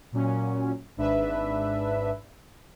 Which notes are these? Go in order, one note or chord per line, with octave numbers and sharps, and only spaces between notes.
A#2 F#3 C#4
G#1 G#2 D4 B4 E5